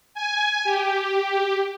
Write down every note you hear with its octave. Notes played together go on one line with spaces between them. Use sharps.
G#5
G4